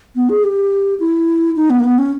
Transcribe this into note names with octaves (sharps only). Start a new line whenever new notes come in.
B3
G#4
G4
E4
D#4
B3
A#3
B3
C#4